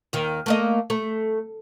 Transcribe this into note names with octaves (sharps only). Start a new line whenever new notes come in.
D#2 D#3
A3 A#3 D#5
A3